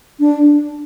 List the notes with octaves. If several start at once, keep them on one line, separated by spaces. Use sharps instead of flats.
D4